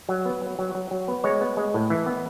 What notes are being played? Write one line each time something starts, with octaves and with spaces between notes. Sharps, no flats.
F#3
B3
F#3
F#3
F#3
F#3
B3
G#3 C#5
B3
G#3
A2
E3
B3